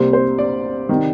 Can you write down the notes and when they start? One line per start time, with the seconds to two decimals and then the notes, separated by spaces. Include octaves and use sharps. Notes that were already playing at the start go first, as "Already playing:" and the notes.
Already playing: C2 C3 G3 A#3 C5
0.13 C5
0.38 D5
0.89 C3 D#3